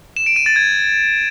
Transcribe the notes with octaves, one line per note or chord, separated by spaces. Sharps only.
E7
D7
D#7
A6
G#6